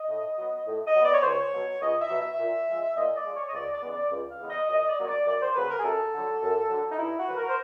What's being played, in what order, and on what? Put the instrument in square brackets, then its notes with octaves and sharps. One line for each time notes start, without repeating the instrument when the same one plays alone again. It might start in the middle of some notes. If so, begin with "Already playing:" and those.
Already playing: [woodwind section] D#5
A2
F#3 B3
A2
D#5
F#3
B3 D5
C#5
C#2 C5
C#5
B2 F#3
C#2 D#5
E5
B2 F#3
E5
A#2
F3 G#3
A#2 D#5
D5
F3 G#3
C#5
D#5
C#2 D5
D5
C#3 E3 G#3 B3
D5
C#2
F5
C#3 E3 G#3 B3
D#5
F#2 D#5
D#5
D5
C#3 F#3 A#3 C#5
D5
F#2 D5
C5
C#3 F#3 A#3 B4
A#4
G#4
F#2 A4
D3 F#3
F#2
D3 F#3
D#4
G2 E4
F#4
D3 F#3 B4
A#4
C5